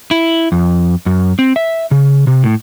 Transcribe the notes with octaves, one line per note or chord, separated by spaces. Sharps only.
E4
F2
F#2
C4
E5
C#3
C3
A2